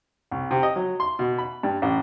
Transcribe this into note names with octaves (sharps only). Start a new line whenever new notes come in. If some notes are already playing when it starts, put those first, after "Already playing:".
C2
C3
D#5
F#3
C6
B2
B5
G2
A1